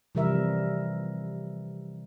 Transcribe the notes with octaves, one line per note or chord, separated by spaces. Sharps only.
C3 E3 F3 G3 A#4 E5